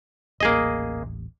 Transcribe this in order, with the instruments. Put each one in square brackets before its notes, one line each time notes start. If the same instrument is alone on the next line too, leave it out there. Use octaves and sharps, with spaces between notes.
[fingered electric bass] D#1 A1 [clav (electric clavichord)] A#3 G#4 D#5